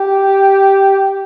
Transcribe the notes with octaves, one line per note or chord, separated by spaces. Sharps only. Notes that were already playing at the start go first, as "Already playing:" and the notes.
Already playing: G4